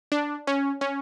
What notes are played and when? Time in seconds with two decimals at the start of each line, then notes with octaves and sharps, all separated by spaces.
0.12 D4
0.47 C#4
0.81 C#4